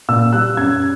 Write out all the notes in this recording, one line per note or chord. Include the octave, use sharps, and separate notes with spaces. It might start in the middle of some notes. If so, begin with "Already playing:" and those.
A#2 E6
G3 F#6
F#2 G#6